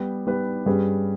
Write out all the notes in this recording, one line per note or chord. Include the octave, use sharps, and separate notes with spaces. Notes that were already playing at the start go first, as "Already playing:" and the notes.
Already playing: G3 B3 G4 B4
G3 B3 G4 B4
G2 G3 C#4 G#4 B4